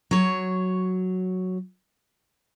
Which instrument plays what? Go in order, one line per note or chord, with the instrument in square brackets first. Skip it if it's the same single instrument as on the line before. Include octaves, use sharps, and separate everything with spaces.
[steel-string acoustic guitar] F#3 C#5